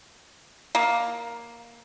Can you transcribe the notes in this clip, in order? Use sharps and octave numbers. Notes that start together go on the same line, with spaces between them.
A#3